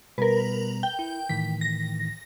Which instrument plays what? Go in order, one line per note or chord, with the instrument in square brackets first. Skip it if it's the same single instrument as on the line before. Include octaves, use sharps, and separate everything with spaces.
[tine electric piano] B2 G3 B3 [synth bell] A#4 B4
[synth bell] G5
[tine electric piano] E4
[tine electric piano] A2 D#3 E3 [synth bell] B6
[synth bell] A#6